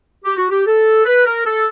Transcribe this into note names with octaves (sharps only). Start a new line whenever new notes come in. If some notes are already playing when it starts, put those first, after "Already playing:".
G4
F#4
G4
A4
B4
A#4
A4